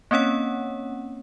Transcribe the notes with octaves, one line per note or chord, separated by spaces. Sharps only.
A#3 C4 C#4 C#5 F#5